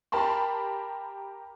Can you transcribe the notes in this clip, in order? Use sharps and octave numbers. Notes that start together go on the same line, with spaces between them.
G4 A#4 A5 B5 C6